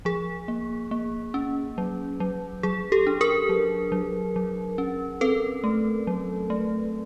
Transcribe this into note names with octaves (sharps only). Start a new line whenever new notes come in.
F3 G#4
A#3
A#3
C#4
F#3
F#3
F#3 G#4
G4 A4
D4
G#4 A#4
F#3
F#3
F#3
C#4
C4 A4 B4
A3
F#3
A3